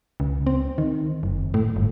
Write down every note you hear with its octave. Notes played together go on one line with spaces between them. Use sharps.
C#2
C4
D#3
F#1
A2
G1